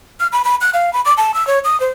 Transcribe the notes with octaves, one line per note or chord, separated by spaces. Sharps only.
F6
B5
B5
F#6
F5
B5
D6
A5
E6
C#5
D#6
C5